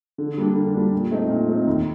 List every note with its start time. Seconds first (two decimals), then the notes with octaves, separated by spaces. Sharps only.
0.18 D3
0.38 G3 A#3 D4
0.56 D3
0.75 G3 A#3 D4
0.93 A#2
1.11 A3 C4 D#4
1.29 A#2
1.48 A3 C4 D#4
1.67 D#2